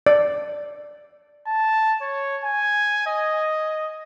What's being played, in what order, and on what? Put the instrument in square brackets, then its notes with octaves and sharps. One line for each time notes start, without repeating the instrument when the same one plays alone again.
[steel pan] D5
[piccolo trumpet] A5
C#5
G#5
D#5